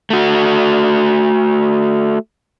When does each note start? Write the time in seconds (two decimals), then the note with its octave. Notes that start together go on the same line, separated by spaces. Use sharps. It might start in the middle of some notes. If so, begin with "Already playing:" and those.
0.10 A3 F#4